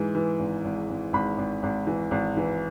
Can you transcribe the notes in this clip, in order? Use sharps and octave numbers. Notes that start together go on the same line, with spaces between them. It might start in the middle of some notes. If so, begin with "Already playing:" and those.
Already playing: G#2 E3
E3
G#1
G#1
G#1
G#1 B5
G#1
G#1
E3
G#1
E3